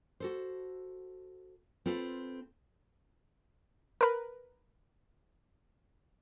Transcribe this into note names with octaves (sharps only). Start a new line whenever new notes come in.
F#4 A4 C5
C4 F4 A4 B4
A#4 B4